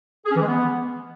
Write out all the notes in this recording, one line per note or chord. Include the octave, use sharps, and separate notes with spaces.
G#4
C#4
E3
G#3
B3